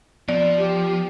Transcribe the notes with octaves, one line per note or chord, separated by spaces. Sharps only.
F3 B3 D5
G4